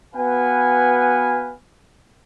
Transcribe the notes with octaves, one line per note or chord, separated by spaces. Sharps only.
B3 F#4 B4 F5 F#5 G#5